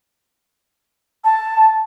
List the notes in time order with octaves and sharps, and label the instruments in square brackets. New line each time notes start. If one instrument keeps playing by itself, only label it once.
[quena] A5